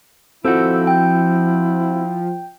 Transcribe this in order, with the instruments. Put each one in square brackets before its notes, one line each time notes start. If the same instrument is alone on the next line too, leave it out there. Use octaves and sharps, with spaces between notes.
[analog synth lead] F3 [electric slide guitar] C4 F#4 [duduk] E4 [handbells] A4 E6 G6
[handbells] G5 G6